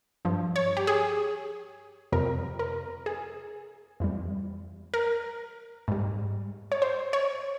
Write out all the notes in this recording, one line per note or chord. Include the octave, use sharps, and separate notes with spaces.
G2 F3
C#5
G4
G#4
F2 C3 F3 A#4
A#4
G#4
F2 E3 G3
A#4
G#2 G3
C#5
C5
C#5